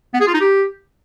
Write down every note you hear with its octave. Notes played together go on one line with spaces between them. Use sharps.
B3
G#4
F4
D#4
G4